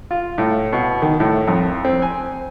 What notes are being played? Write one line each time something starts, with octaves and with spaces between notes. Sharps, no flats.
F4
A2
B2
D#3
A2
F2
C4
G#5